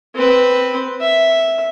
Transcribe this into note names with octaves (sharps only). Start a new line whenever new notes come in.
C4 B4
E5